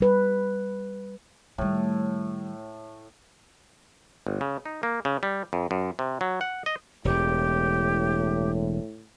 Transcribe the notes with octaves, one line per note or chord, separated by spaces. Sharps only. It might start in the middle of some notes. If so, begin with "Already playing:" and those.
G3 B4
A2 D#3 G3
G1
C#3
D#4
A#3
C#3
G3
F2
F#2
C3
F#3
F#5
D#5
E1 E2 A2 G4